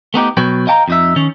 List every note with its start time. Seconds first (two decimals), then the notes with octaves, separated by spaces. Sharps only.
0.14 A3 B3 D#4 G4
0.37 B2 F#3 B4 C#5 G5
0.67 D#5 F5 G5 A5 A#5
0.88 F2 D#4 E5
1.16 D#3 C#4